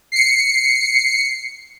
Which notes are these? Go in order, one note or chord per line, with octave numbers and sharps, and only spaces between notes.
C7 C#7